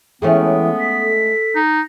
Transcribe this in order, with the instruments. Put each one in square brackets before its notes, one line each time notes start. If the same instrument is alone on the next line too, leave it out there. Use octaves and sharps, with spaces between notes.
[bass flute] E3 [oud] G#3 A3 C#4 [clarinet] B3 [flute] G5
[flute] B6
[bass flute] A4
[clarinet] D#4